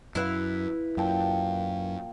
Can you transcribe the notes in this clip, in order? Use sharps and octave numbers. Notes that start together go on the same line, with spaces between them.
F#2 E4 B4 F5
F#2 A#2 G5 A5